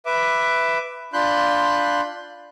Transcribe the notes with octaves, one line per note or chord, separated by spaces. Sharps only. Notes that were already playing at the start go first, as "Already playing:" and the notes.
B4 E5 D6
D4 F4 B5 C6 F#6 G6